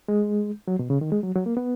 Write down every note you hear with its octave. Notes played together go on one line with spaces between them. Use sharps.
G#3
F#3
B2
C#3
D#3
G#3
F#3
F#3
A#3
B3